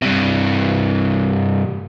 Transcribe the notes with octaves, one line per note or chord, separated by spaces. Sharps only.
G2 C3